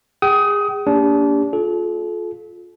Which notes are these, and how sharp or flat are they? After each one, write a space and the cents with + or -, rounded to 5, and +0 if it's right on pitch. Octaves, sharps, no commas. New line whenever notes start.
G#4 -30 G5 -40 D#6 +20
A#3 +0 D4 -30 G4 +25
F4 +20 A4 -35